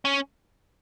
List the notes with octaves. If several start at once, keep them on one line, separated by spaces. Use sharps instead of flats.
C#4